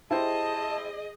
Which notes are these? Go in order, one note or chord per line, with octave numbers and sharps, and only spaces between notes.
E4 G4 G#4 C5 D#5 A5